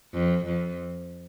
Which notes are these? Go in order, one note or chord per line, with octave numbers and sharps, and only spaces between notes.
F2
F2